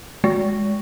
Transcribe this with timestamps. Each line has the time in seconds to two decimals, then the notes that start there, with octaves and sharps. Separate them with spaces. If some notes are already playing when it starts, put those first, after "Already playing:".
0.24 G#3